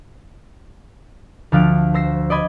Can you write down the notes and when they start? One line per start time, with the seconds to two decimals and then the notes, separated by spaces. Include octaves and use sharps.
1.52 D2 F3 F5 F#6 D7
1.94 C5 E6 A#6 C7
2.30 D5 D#5 B5 G#6